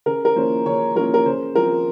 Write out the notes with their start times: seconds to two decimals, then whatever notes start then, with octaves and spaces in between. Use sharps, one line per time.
0.06 C#3 A#4
0.25 A#4
0.36 F3 A#3 C#4 E4 C5
0.66 C#3 C#5
0.95 F3 A#3 C#4 E4 A#4
1.14 A#4
1.25 C#3 C5
1.55 F3 C4 F4 A#4